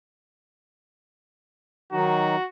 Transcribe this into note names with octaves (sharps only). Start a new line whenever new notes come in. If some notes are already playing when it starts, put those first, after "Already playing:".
D#3 F#3 D#4 F#4